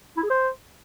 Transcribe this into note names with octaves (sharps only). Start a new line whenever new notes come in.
E4
G#4
C5